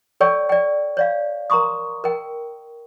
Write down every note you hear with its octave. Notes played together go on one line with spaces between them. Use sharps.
A4 C#5 D5 G5 C#6 E6
D5 G5
C#5 D5 F5
A#4 A#5 C6 C#6 D#6
A#4 G5